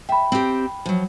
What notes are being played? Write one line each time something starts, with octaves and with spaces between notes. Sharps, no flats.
E5 G5 B5
C4 G4
F3 F#3